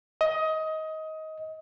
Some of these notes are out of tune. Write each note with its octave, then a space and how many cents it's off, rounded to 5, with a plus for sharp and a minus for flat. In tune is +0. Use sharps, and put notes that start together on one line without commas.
D#5 +20